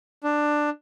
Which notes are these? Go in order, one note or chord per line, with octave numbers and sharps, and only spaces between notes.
D4